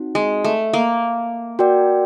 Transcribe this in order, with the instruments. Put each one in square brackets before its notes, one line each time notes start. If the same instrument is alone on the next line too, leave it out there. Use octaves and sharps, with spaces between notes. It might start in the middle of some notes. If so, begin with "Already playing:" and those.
Already playing: [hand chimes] C4 D#4 F#4
[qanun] G#3
A3
A#3
[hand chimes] F#4 A#4 D5 G5